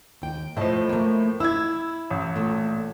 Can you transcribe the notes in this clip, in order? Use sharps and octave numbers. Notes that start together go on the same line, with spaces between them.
D#2 G5
A2 F3 A3 D#5 A5
A3 A#3
E4 E5 E6 G#6
A1
A#2 A3